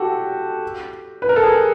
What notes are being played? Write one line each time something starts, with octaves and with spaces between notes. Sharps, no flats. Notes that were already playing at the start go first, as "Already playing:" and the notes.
Already playing: F#4 G4 A4
B4
A#4
A4
G#4